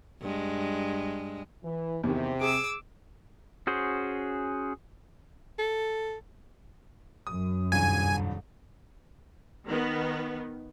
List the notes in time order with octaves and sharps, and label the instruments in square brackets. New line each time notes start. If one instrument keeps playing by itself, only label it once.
[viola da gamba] G2 G#3
[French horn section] E3
[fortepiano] E2 D#3 [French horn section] C3
[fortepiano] G#4 [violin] D6 E6
[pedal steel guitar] C#4 F#4 G#4 C5
[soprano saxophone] A4
[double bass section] F#2 [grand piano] D#6
[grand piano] D#1 C2 G2 [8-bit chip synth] G#5
[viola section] D#3 B3